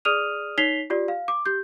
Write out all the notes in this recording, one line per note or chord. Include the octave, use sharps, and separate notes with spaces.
G#4 D5 D#6 F6 D#7 F7
D#4 C#5 B6 C7 F7 G7
F4 G4 D5
F5
D6
G4 G6